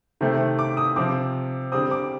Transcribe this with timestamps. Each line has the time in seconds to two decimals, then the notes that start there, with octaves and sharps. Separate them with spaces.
0.21 C3 D#3 A3 C4
0.59 D6
0.77 D#6
0.96 C3 F3 C4 D6
1.72 D3 G3 C4 D#6
1.91 D6